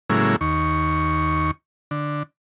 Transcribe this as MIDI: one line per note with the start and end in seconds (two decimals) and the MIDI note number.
0.10 0.36 45
0.10 0.36 49
0.10 0.36 54
0.10 0.36 56
0.10 0.36 58
0.10 0.36 64
0.41 1.51 39
0.41 1.51 85
1.91 2.23 50